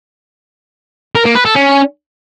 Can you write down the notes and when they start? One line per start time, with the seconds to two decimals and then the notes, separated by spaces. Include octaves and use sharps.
1.15 A#4
1.25 A#3
1.35 B4
1.45 A4
1.55 C#4